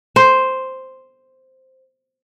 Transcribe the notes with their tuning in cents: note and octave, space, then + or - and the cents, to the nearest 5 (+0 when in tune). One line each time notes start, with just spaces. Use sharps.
C5 +0